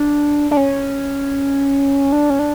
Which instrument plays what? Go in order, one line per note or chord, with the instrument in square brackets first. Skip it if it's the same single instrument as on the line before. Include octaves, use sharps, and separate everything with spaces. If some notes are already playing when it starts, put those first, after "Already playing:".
Already playing: [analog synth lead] D4
D4
C#4
D4
C#4
D4